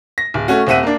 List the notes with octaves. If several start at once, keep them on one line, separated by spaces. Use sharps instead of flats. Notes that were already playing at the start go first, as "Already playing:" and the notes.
A#6
D1
A3 C#4 F#4
D#1 C4 E5 F#5 D#7
A#3 D4